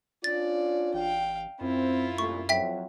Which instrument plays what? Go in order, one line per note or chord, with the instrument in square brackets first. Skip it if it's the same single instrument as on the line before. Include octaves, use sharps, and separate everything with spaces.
[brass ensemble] C#4 D4 F4 [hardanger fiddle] D5 [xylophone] A6
[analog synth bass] A1 [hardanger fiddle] F5 G5
[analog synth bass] F#2 [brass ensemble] C4 [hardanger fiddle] E4 F4
[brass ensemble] C2 A#2 A3 [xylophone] C#6
[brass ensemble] F2 F#3 [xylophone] E5 G5 B6